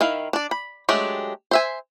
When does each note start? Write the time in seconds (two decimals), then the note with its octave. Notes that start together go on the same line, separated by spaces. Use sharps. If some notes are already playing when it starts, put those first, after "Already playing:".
0.01 D#3 E4 F5
0.33 D4 D5
0.51 B5
0.89 F#3 G#3 A3 D4 G4
1.51 C5 E5 G#5